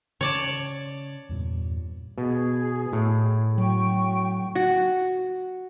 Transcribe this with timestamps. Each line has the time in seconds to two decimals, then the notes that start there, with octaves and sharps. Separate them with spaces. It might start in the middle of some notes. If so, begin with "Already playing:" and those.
0.21 C#3 C#5 D5 A5
1.29 E2 G2 A#2
2.18 B2 G#4
2.93 A2
3.58 F#3 G5 C#6
4.55 F#4